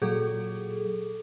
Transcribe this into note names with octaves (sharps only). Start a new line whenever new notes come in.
A#2 F#3 G#4 A4